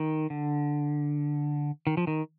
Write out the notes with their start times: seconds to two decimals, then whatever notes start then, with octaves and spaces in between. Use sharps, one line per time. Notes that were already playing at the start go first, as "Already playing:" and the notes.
Already playing: D#3
0.30 D3
1.87 D#3
1.97 F3
2.07 D#3